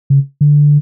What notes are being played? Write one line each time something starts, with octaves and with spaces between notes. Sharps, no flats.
C#3
D3